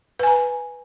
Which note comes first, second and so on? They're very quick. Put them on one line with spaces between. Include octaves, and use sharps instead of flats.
B4 G#5 A#5